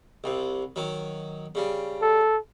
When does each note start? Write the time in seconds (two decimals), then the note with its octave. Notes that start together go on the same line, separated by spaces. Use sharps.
0.24 C2 C3
0.76 D#3 F#3
1.55 C#3 G3
2.02 A4